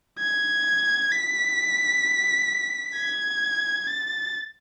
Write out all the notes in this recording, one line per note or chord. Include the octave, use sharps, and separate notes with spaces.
G#6
B6
G#6
A6